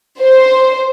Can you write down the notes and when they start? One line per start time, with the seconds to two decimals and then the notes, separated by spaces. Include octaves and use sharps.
0.20 C5